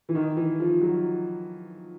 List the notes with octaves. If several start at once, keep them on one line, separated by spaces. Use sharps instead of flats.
E3
D#3
E3
F3
F#3